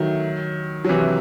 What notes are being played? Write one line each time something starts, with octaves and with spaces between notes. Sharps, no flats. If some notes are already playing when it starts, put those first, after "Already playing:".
Already playing: D#3 F#3 A3
F#3
C3 E3